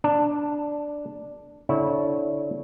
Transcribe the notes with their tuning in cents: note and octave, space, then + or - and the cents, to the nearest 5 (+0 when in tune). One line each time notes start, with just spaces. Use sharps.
D4 +0 A5 +15
D3 -20 E4 -25 C#5 -5